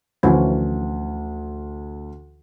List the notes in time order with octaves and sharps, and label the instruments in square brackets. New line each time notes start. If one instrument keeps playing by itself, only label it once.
[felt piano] D2 [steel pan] E3 F3 C#4